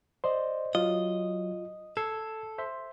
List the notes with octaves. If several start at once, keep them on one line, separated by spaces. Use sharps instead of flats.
C5 D5 D#5 C6
F#3 F4 D#5
A4 E6 G#6 C7
C5 E5 C6